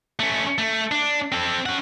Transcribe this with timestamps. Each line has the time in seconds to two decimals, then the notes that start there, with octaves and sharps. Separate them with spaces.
0.20 A3 C#4
0.58 A3
0.92 D4
1.32 C4 A4
1.66 C#4 F#5